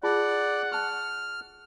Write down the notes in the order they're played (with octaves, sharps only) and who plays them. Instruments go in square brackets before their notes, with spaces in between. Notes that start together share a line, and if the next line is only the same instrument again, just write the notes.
[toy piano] F4 G#4 A5 [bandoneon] D5 [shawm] F#5
[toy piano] A5 C#6 [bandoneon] F6